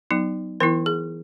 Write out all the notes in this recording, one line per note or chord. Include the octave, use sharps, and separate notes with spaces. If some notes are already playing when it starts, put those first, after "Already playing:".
F#3 B3 D#4
E3 B3 E4 A#4
G#4